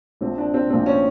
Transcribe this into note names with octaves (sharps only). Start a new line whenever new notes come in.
A#1 A#2 F3 C4
D4
C4
A#1 A#2 F3 C4
C#4